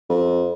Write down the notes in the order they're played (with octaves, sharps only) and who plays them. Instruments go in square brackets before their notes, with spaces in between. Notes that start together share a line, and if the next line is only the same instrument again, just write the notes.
[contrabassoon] F2